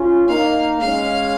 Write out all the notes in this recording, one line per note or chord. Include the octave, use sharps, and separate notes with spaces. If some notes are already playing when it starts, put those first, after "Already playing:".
Already playing: C#4 F4
A#3 D#4 F5
G#3 C#4 F5